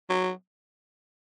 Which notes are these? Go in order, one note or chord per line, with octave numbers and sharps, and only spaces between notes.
F#3